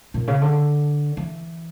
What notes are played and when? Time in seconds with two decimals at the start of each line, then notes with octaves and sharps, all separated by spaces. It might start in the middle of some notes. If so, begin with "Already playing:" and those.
0.14 A#2
0.28 C#3
0.41 D3
1.17 E3